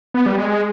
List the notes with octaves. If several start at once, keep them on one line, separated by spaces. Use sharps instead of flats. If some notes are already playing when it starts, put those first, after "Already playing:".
B3
G3
G#3